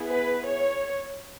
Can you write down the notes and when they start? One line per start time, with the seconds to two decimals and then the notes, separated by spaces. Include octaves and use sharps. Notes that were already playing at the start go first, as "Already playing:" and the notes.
Already playing: B3 E4 G#4
0.08 B4
0.49 C#5